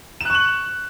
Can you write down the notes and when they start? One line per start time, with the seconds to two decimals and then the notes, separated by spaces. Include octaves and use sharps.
0.21 E7
0.25 F#6
0.30 C#6
0.34 F#7